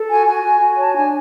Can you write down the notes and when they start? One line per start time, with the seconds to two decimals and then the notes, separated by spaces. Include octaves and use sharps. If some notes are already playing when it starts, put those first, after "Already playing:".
Already playing: A4
0.08 F#4 G#5
0.25 F#4 G#5
0.43 F#4
0.60 F#4
0.77 C#5 A5
0.94 D4 G#5